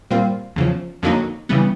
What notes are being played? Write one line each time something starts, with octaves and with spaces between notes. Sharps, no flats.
A#2 G3 C4 F4
E2 C#3 F3
F2 D3 F#3 A#3 D#4
C#3 E3 G3 B3